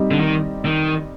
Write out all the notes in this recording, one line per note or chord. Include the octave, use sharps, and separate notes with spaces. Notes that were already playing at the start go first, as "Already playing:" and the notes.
Already playing: G3 C4 D#4 G4
D3
D#3
D#3